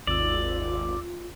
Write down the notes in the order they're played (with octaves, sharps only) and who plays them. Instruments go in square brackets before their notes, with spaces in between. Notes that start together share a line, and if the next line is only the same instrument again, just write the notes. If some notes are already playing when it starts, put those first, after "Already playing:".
[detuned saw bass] G#1 [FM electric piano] D#2 E6 [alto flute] F4 [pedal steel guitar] D5